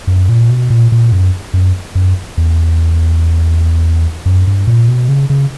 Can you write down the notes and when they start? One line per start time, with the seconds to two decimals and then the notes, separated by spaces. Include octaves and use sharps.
0.07 F#2
0.29 A#2
0.50 B2
0.70 A#2
0.92 A#2
1.12 F#2
1.53 F#2
1.95 F#2
2.37 E2
4.26 F#2
4.47 G2
4.67 A#2
4.88 B2
5.09 C#3
5.30 C#3